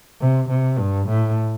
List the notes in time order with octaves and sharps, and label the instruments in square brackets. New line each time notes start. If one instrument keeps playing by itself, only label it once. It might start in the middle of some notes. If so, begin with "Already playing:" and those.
[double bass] C3
C3
G2
A2